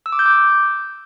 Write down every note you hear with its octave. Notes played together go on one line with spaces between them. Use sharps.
E6
D6
G6
D6